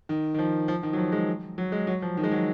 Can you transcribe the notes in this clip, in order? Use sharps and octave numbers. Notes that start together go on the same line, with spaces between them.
D#3
D#3
F3
F3
D#3
F#3
F3
G#3
F#3
G#3
F#3
F3
D#3
G#3
F#3